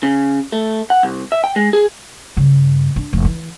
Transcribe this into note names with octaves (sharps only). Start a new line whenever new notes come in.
C#3
A3
F#5
C2
E5
G5
G#3
G#4
G2 C#3
D4
F1 F3
E3